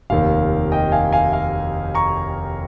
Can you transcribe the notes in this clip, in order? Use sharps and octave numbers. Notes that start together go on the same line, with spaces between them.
F1 D#2 D#3 F5
D#5 G5
F5 G#5
F5 G#5
F5
A#5 C#6